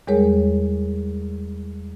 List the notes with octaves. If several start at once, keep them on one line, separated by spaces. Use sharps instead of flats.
E2 G3 G#3 G#4 A#4 C#5